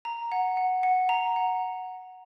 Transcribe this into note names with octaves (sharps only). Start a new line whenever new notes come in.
A#5
F#5
F#5
F#5
A#5
F#5